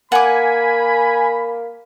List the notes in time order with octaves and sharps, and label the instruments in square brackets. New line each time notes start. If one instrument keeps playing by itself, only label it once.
[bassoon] A#3 [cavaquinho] F#5 D6 [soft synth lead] G#5 [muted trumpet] B5